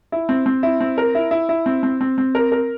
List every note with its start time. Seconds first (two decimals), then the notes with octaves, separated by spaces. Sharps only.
0.12 E4
0.29 C4
0.46 C4
0.63 E4
0.80 C4
0.98 A#4
1.15 E4
1.31 E4
1.49 E4
1.66 C4
1.83 C4
2.01 C4
2.18 C4
2.35 A#4
2.52 A#4